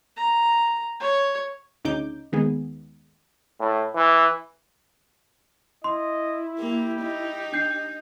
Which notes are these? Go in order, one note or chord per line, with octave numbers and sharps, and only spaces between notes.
A#5
C#5
D2 C#3 D#4 D6 G6
D#2 D#3 G#3 B3 G#4
A2
E3
E4 D#5 C6
A#3 G4
D#4
D4 G6 C7